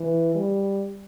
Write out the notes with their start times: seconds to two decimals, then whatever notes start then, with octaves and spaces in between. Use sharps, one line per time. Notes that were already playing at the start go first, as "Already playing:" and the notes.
Already playing: E3
0.35 G3